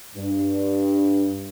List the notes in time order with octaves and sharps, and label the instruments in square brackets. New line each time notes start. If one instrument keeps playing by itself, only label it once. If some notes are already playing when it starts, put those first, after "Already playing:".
[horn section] G2